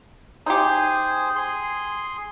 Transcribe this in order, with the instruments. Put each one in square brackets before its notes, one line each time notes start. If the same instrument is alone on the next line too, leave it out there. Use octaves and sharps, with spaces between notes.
[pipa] D#4 G4 [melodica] G#4 C5
[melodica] G#4 C6